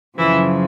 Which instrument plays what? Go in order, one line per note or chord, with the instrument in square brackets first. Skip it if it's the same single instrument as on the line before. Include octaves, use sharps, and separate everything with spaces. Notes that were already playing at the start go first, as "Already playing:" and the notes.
[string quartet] F#2 C#3 E3 F3 E4